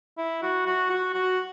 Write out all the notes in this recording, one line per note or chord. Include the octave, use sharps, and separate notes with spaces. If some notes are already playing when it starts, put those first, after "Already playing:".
E4
F#4
F#4
F#4
F#4